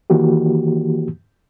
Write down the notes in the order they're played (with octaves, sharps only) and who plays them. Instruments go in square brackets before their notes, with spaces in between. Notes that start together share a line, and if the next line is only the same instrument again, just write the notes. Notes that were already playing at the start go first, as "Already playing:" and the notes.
[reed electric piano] D#3 E3 A#3 F#4 G4